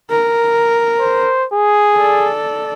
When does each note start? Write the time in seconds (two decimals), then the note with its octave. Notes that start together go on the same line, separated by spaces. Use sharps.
0.10 A#4
1.00 C5
1.54 G#4
1.95 A4 D5